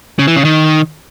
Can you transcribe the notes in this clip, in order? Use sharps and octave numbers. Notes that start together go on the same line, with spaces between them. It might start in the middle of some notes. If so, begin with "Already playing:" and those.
C#3
E3
C#3
D#3